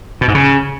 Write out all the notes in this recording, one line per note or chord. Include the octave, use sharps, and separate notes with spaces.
B2
G#2
C#3